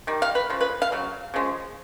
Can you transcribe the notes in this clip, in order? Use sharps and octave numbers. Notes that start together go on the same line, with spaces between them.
D#3 G3
F5
B4
C#3 F3
B4
F5
C#3 F#3
C#3 F3 G#3